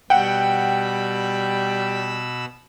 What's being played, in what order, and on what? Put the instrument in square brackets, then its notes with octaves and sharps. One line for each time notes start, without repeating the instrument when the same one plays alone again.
[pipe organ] B2 B5 E6 [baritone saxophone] G3 [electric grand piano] F#5 G5